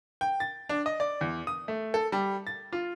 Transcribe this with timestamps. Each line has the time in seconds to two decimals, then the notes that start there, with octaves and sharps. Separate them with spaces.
0.21 G5
0.40 A6
0.69 D4
0.86 D#5
1.00 D5
1.21 E2
1.47 D#6
1.68 A3
1.94 A4
2.12 G3
2.47 A6
2.73 F4